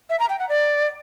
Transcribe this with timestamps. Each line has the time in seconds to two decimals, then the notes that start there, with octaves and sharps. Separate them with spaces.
0.10 E5
0.20 A#5
0.29 G5
0.39 F#5
0.49 D5